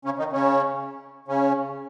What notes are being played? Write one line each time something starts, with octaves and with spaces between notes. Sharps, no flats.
C#3 C#4
D#3 D#4
C#3 C#4
C#3 C#4